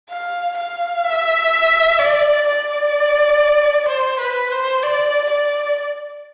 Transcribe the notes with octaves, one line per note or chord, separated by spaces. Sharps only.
F5
F5
E5
D5
D5
C5
B4
C5
D5
D5